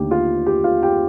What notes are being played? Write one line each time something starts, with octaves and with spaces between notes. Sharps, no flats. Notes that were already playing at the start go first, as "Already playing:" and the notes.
Already playing: D#2 D3 A3 G4
F4 F5
G4 G5
F4 F5
G4 G5